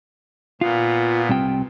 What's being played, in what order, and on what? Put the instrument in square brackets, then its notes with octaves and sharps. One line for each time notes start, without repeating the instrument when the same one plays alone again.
[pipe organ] A#2 B3 [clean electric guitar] F4
[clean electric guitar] C2 C3 G5